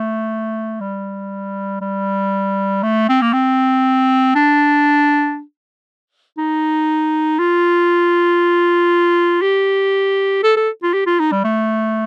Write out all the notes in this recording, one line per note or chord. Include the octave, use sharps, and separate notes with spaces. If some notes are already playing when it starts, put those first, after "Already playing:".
Already playing: A3
G3
G3
A3
C4
A#3
C4
D4
D#4
F4
G4
A4
A4
F4
G4
F4
D#4
G3
A3